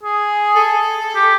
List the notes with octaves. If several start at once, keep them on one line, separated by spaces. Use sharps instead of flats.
G#4
A4
G4